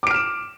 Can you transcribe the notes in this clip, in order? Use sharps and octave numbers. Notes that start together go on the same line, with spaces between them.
D6 F6 D7 E7